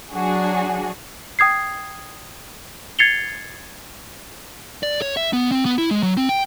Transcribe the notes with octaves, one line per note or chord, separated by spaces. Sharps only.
F#3 D4 F#4 G#4
G5 D#6 G#6 C7
G#6 A6 C7 C#7 F7 G7
D5
C#5
E5
B3
C4
B3
E4
G#3
F#3
C4
G5